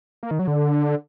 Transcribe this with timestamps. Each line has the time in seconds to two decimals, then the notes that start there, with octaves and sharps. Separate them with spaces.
0.23 A#3
0.31 D#3
0.39 F#3
0.47 D3